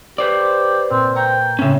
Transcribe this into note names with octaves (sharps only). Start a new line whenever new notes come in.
G4 B4 C5 D5 E6
A#2 C4
G5 A#5 C#6 G#6
A2 C#3 C#4 E5